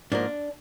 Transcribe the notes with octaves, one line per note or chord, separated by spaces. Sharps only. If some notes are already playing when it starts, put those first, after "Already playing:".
G#2 F3 A#3 D4